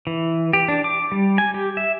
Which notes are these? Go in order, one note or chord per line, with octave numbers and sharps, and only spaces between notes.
E3
G4
D4
D6
G3
G#5
G4
E5